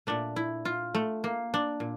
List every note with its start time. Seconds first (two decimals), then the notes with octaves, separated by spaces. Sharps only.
0.07 A#2 A3 D4
0.36 E4
0.65 F4
0.95 A3
1.24 A#3
1.54 D4
1.80 A#2